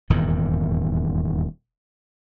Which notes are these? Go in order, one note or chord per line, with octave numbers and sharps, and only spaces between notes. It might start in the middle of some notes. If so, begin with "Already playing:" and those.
D#1 E2 G#2 D#3